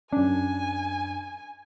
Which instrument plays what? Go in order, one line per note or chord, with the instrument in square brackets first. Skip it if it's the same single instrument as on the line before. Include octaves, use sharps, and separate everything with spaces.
[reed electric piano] F#2 D4 [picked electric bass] C#4 [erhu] G#5